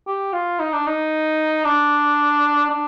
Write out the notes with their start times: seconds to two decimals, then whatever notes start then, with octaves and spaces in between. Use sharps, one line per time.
0.07 G4
0.33 F4
0.60 D#4
0.73 D4
0.87 D#4
1.64 D4
2.70 D4